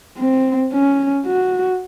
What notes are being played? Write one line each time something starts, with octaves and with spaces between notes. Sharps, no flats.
C4
C#4
F#4